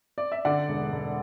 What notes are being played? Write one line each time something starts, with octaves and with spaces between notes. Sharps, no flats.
D5
E5
D3 D5 F#5
E1
E1